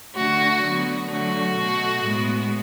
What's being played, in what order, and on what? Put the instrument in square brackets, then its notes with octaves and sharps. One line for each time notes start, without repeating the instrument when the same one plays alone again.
[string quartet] D3 A3 F#4
D3 F#3 B3
D3 F#3 A3 F#4
B2 A3
A2 G#3 B3